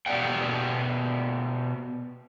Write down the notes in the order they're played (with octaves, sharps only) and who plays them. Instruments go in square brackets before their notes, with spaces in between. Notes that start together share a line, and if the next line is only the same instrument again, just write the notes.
[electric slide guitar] B2 G4 D5 F#5 G5